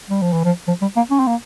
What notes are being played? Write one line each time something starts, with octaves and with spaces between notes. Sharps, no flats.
G3
F3
E3
F3
F3
G3
A#3
C#4
C4
A#3